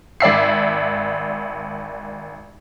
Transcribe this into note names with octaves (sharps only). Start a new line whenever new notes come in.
G#1 D5 E5 C7